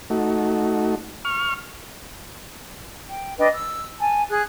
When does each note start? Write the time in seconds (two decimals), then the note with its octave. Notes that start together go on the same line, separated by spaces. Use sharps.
0.10 A3 D#4 F#4
1.25 C#6 F6
3.09 G5
3.38 D4 B4 D#5 G5
3.52 E6
4.00 G#5 A5
4.29 G#4 F#6